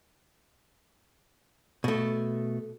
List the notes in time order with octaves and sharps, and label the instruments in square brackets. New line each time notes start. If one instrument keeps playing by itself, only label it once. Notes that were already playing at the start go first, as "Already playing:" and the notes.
[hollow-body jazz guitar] B2 A3